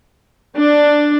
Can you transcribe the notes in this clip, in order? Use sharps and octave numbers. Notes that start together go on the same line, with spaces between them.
D4